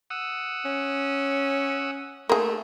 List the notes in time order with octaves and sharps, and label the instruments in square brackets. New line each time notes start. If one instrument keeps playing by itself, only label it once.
[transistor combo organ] F#5 D#6 E6
[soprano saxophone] C#4
[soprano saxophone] A3 [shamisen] A#3 G#4